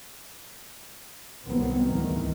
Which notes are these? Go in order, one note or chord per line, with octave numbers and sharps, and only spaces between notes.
C2 D#3 F#3 B3 C4
D2 G#2 D#3 E3